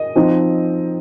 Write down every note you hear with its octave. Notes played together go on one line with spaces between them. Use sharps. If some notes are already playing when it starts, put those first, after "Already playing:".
Already playing: D#5
F3 C4 D#4